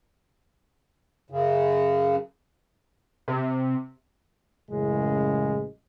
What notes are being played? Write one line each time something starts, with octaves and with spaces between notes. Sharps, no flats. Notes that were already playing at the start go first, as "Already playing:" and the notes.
F#2 C#3
C3
A1 F#2 C#3 E3 G#3